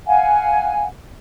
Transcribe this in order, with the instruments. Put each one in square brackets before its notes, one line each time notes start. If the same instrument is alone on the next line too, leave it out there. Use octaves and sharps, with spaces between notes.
[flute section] F5 F#5 G#5